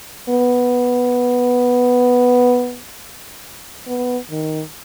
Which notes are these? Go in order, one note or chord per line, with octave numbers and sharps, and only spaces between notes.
B3
B3
D#3